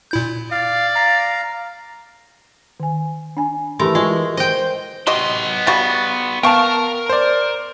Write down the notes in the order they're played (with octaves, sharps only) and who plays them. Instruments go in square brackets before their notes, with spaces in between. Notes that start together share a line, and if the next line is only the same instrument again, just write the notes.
[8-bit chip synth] A#2 E4 G6
[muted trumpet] D5 [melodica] F5
[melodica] F5 A#5
[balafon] D#3 G#5
D4 G#5
[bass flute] E3 [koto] A3 A#4 [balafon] G4 B5 C6
[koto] G#3 [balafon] F4 C#6
[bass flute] C5 [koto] D#5 G5
[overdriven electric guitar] B3 C6 [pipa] F#4 G4 D#5
[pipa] C#3 G3 F#4 [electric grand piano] A6
[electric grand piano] B3 F5 A5 [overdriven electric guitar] A#4 [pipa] G5 C#6
[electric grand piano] C5 D5